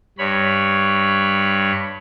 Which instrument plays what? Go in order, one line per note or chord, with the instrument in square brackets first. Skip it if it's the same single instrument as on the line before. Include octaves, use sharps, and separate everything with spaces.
[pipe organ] G2 C#5 B5